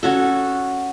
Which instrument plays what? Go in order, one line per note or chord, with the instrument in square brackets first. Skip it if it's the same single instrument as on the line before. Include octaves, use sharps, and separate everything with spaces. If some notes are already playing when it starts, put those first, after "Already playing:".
[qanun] C#4 F#4 A4